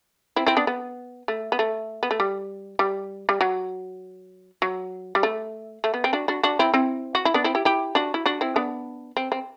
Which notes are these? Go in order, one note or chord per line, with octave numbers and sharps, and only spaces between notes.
C4 E4
C4 E4
B3 D4
B3
A3
B3
A3
B3
A3
G3
G3
G3
F#3
F#3
G3
A3
A3
B3
C4
D4 F#4
D4 F#4
D4 F#4
C4 E4
C4 E4
F#4
E4
B3 D4
C4 E4
E4 G4
E4 G4
D4 F#4
E4
D4 F#4
C4 E4
B3 D4
C4
C4